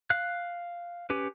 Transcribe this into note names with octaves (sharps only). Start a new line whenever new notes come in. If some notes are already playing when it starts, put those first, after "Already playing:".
F5 F#6
C#4 G4 B4